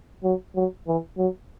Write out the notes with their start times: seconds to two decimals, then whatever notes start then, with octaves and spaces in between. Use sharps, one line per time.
0.24 F#3
0.56 F#3
0.87 E3
1.18 F#3